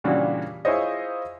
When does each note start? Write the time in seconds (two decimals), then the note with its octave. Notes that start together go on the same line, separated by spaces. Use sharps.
0.04 A#2 C#3 E3 G3 D4 F#4
0.65 E4 F4 G#4 C5 C#5 D#5